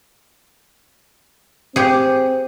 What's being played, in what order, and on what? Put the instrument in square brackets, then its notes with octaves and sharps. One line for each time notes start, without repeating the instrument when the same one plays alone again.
[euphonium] C4 [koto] G4 G#4